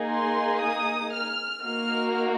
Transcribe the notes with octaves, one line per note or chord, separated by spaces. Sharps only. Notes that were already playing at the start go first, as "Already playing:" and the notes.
Already playing: A#3 D#4 G#4
C6
D#6
F6
A#3 D#4 F#4 F6